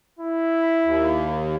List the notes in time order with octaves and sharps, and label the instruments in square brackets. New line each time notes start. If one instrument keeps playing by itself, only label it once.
[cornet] E4
[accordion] D#2